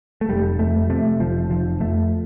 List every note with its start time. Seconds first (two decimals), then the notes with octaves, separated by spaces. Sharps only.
0.21 A3
0.29 F1 G3
0.59 F2 A3
0.90 C3 A3
1.20 F1 F3
1.50 F1 F3
1.80 F2 A3